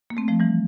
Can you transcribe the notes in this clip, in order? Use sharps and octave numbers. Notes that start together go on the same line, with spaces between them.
A#3
A3 C4
F3 A3
E3 G3